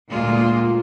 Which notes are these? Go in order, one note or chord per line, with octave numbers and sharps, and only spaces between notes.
D2 A#2 G#3 A#3 F4